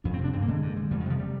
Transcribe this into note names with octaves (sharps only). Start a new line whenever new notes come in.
F2 D4
C4
C3
D4
G2 C4
A#3
D3 G#3
G2
D3
F2 G3
D#3
C3 F3
G3